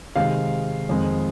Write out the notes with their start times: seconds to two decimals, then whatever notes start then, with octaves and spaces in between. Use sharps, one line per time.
0.16 C3 D#3 G#3 F5
0.89 F2 D#3 G#3